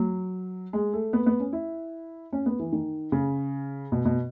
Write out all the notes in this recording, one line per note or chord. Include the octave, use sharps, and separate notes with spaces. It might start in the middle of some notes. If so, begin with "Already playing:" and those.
Already playing: F#3
G#3
A3
B3
B3
C#4
E4
C#4
B3
E3
D#3
C#3
B2
B2